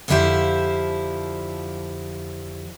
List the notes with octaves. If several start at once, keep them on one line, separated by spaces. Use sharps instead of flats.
F2 D3 F3 E4 G4 C5